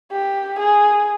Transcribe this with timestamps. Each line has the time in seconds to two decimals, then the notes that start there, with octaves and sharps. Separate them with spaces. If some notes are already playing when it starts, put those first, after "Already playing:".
0.12 G4
0.59 G#4